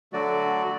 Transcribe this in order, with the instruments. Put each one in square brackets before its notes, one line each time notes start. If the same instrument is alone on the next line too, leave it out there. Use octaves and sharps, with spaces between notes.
[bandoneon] D3 F#3 A3 F#4 D5